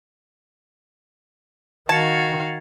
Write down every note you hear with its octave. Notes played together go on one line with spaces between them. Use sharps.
D#3 F#4 F5 A5 G#6 A6 C#7